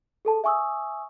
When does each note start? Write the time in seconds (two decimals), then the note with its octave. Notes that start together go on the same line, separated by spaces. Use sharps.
0.25 G#4 A4 A5
0.44 E5 G#5 C#6 D#6 E6